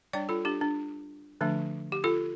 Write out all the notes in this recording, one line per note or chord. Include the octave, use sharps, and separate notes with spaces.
G3 D4 D5 G5
F4 A4
D4 G4
D4
D3 F3 A3 D4
G4
F4 A4